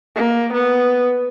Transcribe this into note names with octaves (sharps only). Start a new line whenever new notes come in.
A#3
B3